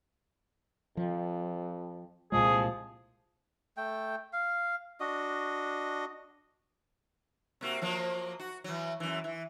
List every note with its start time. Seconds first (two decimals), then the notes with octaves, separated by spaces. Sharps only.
0.97 F2 F3
2.32 C2 A#2 F3 G#3 G#4
3.77 A3 G5
4.33 F5
5.00 D4 F#4 D#5
7.61 C3 A#3 F#4
7.82 F3 F#3 A#3
8.40 F#4
8.64 E3 F#3
9.00 F#2 E3
9.24 E3